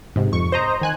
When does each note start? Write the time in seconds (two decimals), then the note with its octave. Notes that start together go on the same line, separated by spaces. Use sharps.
0.16 G#2 C3
0.32 F2 C#6
0.52 C5 D#5 A#5
0.81 D#3 G#5 F#6